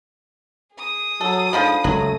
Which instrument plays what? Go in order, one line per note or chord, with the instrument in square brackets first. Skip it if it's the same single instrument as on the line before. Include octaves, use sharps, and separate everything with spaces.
[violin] G#4 D#6
[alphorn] F#3 [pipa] A4
[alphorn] G#2 [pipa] D3 F3 G3
[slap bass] F#1 C#2 [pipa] F#3 [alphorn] A3